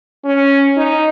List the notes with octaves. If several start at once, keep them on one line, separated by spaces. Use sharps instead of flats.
C#4
D#4